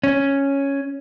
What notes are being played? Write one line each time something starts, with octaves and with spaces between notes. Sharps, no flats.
C#4